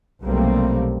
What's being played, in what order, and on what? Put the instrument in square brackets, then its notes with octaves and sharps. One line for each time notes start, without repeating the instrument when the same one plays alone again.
[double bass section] B1 C3 G3 A3 A#3 C4